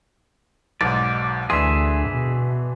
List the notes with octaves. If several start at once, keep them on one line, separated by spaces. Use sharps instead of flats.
B1 G#2 D5
D2 E3 D4 G#4 E5 C6
B2